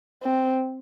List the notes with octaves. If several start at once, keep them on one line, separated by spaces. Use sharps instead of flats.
C4